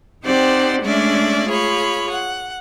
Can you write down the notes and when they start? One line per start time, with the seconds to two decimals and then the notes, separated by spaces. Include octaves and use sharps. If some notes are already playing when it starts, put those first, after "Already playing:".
0.25 C4 D#4 G4 C5 D5 F#5
0.82 G#3 A3 C#4 D4 D5 E5
1.48 F4 G#4 C#5 B5
2.10 F#5